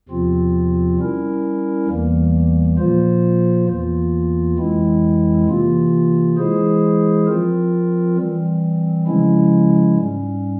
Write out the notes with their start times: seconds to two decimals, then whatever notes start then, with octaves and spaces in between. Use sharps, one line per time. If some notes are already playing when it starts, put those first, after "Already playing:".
0.09 E2 C3 F3 C4 F4
0.98 G3 C#4 E4 A#4
1.88 E2 E3 G3 A#3
2.78 A#2 F3 A#3 F4 C5
3.68 E2 E3 A#3 F4
4.58 F2 E3 G#3 C4 E4
5.48 C3 E3 A#3 F4
6.38 E3 G#3 E4 G#4 C5
7.28 F3 C4 F4 A#4
8.18 E3 G3 C4
9.07 C#3 F3 G#3 C#4 E4
9.97 G#2 G3 C#4